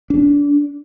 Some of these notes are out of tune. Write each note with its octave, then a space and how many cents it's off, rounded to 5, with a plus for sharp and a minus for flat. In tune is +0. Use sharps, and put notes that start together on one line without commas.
D4 -25